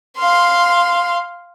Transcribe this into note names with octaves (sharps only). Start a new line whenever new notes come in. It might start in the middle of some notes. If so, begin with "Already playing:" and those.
F5 C6